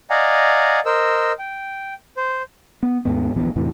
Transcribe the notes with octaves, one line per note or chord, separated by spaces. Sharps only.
D5 D#5 F5 F#5 G#5 A#5
A#4 C5 D#5 E6
G5
C5
B3
D#2 G#2 B3
D1 A#1 E3 B3
E2 A2 C3 E3